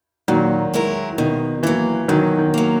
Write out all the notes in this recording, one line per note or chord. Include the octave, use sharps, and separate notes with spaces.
A#2 D#3 F#3
G#3 C#4 E4 A#4
B2 D#3
E3 F#3 A#3
B2 D#3 F#3
D#3
F#3 A#3